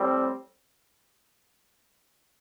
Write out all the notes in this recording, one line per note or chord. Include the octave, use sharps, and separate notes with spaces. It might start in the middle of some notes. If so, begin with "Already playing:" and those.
Already playing: A2 G3 C4